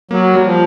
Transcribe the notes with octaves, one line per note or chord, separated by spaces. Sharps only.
F#3 A#3
G3
F3